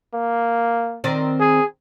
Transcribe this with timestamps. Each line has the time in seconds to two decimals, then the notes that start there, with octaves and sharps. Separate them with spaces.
0.14 A#3
1.04 D#3 C4 D5
1.40 G#4